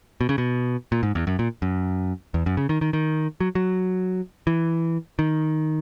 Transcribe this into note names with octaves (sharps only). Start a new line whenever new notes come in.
B2
C#3
B2
A#2
G#2
E2
F#2
A#2
F#2
E2
F#2
C#3
D#3
D#3
D#3
F#3
F#3
E3
D#3